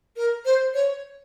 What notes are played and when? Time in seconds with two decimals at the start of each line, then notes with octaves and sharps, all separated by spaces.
0.16 A#4
0.45 C5
0.74 C#5